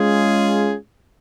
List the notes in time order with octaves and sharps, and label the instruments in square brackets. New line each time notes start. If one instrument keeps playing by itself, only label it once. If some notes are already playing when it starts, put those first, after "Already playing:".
Already playing: [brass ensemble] G#3 C#4 F4 G#4